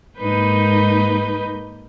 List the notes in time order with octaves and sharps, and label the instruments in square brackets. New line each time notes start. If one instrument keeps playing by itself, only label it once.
[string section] G#2 A#3 G6 [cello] D#4 B4